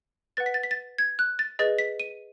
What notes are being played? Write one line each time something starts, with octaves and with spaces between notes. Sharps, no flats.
B4 F#5 A6
B6
A6
B6
A6
G#6
F#6
A6
G#4 B4 D#5 A6
B6
D#7